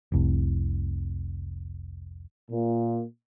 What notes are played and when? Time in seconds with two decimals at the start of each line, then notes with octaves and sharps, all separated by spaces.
0.12 F1 C2
2.51 A#2